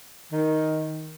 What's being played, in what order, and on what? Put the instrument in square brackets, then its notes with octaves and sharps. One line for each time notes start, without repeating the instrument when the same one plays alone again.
[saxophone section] D#3